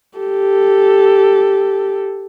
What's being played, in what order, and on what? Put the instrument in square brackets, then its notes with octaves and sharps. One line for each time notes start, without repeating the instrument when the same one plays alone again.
[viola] G4 A4